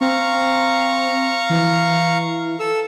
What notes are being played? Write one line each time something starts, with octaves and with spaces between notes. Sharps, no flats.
C4 F5 A#5 C#6
E3
A4 E6